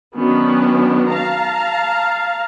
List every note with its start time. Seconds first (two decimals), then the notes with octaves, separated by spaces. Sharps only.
0.15 D#3 F#3 B3 C#4 D4
1.09 F5 A5 A#5